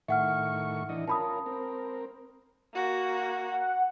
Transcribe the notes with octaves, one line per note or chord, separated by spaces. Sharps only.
A2 D#3 E5 F#5 C#6 F6
E3 D4 D#5
C#4 F4 A#4 A5 B5 D#6
C4 A#4
A#3 F#4
F#5